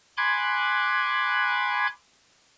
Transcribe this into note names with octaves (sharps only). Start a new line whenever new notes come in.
G#5 B5 C6 D6 F#6 G#6